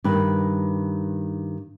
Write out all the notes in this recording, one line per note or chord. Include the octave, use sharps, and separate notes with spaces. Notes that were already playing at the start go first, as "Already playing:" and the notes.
G2 D#3 B4